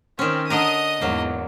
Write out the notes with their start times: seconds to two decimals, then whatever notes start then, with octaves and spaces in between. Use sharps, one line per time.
0.19 D#3 C4 C#4
0.50 D3 D4 D#5 A#5 D#6
1.01 E2 G#2 F#3 A#3